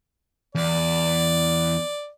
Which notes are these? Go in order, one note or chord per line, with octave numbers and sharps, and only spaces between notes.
E2 D5